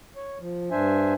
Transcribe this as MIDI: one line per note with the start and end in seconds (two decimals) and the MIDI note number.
0.16 0.38 73
0.40 0.69 53
0.71 1.14 43
0.71 1.14 62
0.71 1.14 72
0.71 1.14 76
0.71 1.14 80